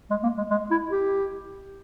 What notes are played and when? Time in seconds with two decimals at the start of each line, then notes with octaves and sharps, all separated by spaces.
0.10 G#3
0.23 A#3
0.37 G#3
0.50 G#3
0.71 E4
0.91 G4